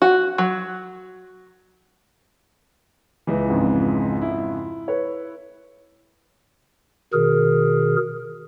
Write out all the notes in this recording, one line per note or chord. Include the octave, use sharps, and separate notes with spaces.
F#4
F#3
C#2 E3
F2 G#2 C#3
E4
B4 C#5
B2 D#3 G#4 A#4